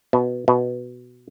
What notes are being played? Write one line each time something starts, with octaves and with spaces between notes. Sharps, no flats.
B2
B2